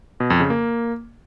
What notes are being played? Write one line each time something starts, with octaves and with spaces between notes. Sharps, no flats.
B2
F2
C#3
A#3